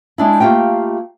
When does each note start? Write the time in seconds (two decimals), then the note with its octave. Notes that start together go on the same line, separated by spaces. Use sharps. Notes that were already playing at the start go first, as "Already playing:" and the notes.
0.18 G#3 D4 E4
0.40 A3 A#3 F4 G4 G5